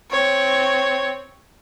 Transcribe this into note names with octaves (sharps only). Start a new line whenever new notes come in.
C4 C#5